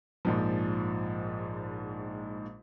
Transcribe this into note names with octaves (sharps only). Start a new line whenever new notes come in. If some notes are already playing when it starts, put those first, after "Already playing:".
A#1 G#2 F3